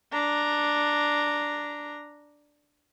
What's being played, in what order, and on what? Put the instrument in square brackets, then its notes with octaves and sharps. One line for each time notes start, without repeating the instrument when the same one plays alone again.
[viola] D4 A#5